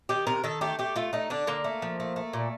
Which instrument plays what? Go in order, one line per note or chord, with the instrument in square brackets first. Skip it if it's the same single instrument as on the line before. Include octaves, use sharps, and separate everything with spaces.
[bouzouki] D#3 G4
C3 A#4
D#3 A4
A3 G4
A3 G4
A3 F4
A3 D#4
D3 D4
D3 A#3
A3
F3
A3
A3
A#2